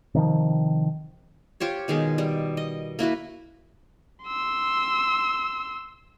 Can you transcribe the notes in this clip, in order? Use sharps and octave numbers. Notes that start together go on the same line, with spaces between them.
C3 D#3 F3
F4 G4 C5 C#5
B2 D#3 G#3 G#4
G3
D#5
A#3 E4 F#4 B4
C6 E6